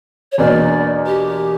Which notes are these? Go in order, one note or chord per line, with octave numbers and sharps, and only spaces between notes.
C#5
E2 B2 A#3 D4 A#4 D5
G4